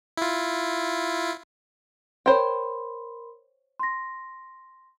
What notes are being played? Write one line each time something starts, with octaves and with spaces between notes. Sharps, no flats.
E4 F4
A#4 C5 C#5 G5 B5 C6
C6 A#6